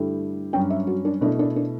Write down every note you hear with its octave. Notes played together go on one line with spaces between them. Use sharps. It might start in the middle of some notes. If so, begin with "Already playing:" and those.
Already playing: G2 D3 A3 E4 G4
G2 F#3 C#4 G5
E5
F#4
D4
B2 A3 D4 E4
D4
D4